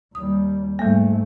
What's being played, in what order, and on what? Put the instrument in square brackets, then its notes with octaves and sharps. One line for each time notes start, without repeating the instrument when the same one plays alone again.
[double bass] D#2 G3 [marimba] D#6
[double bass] G#2 A3 [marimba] G3 A#3